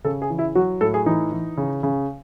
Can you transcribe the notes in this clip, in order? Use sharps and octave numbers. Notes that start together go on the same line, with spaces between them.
C#3 A4
G#4
E3
E4
F#3 F#4
A2 A4
G#4
E3 D#4
E3
C#3
C#3